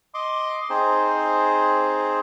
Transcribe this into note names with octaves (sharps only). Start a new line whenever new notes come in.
D#5 C6 D6
C4 D#4 G#4 C5